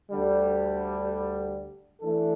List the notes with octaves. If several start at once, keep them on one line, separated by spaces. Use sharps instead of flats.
D2 D3 G3
E3 A3 D4 A4